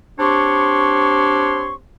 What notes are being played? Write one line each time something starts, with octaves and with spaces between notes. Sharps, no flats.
C4 D4 G4 C#5 C6 C#6